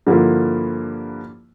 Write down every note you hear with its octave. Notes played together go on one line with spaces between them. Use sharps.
G2 D3 F3 A#3 E4